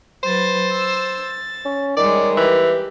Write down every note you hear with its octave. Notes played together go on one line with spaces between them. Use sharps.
F#3 B4 C5 A6
E6 A6
A6
C#4
D#3 G3 G#3 C#5 D5
E3 G4